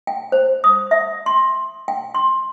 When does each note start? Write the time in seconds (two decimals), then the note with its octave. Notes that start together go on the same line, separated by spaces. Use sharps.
0.07 G5
0.32 C5
0.64 D#6
0.91 E5
1.26 C6
1.88 G5
2.15 C6